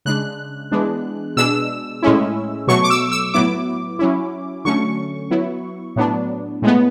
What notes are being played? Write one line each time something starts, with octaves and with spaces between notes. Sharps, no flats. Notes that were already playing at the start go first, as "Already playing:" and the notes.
C#3 G#3 D4 F#6
E3 G#3 B3 D4
B2 G#3 D4 E6
A2 G#3 C#4 E4
B2 F#3 A3 C#6
D6
E6
E6
A2 F#3 B3 E4 D6
F#3 C#4 E4
D3 F#3 A3 C#4 C#6
F#3 B3 E4
A2 F#3 B3 D4
A2 G#3 B3